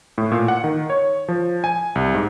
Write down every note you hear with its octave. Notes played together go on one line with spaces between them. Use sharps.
A2
A#2
F#5
D#3
C#5
F3
G#5
C2
G#2